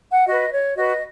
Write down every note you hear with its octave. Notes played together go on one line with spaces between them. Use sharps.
F#5
F#4 B4 D#5
C#5
F#4 B4 D#5